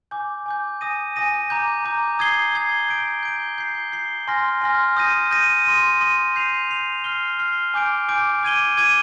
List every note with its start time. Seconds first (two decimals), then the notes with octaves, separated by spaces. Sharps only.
0.11 G#5 D6 G6
0.46 G#5 D6 G6
0.81 G#5 D#6 A#6 D#7
1.16 G#5 D#6 A#6 D#7
1.50 A#5 D6 G6
1.85 A#5 D6 G6
2.19 D#6 G#6 C7 G7
2.54 D#6 G#6 C7 G7
2.89 G6 D7 G7
3.23 G6 D7 G7
3.58 G6 C7 G7
3.92 G6 C7 G7
4.27 G#5 C6 F6 A#6
4.62 G#5 C6 F6 A#6
4.97 D#6 G6 A#6 D#7
5.31 D#6 G6 A#6 D#7
5.66 C6 D#6 A#6 D#7
6.01 C6 D#6 A#6 D#7
6.36 G6 C7 F7
6.70 G6 C7 F7
7.04 F6 C7 G7
7.39 F6 C7 G7
7.74 G#5 D6 G6 D7
8.08 G#5 D6 G6 D7
8.43 D6 G#6 D#7 G7
8.78 D6 G#6 D#7 G7